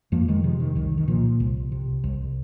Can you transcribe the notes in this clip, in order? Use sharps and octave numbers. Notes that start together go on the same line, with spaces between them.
F2 F3 A#3
D#3 G#3
C3 F3
D#3
C2 D#3
D#3
A#2 F3
C2
C3
C2